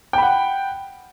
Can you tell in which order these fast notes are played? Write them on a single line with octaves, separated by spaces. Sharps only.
G5 B5 F#5